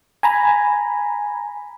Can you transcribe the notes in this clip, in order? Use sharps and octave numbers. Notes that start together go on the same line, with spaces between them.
G#5 A#5 B5